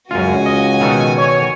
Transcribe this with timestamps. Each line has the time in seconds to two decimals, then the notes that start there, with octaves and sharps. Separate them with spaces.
0.11 C#2 F#2 F4 F#4 G#5
0.46 D#5
0.81 B2 D#3 A4
1.17 C#5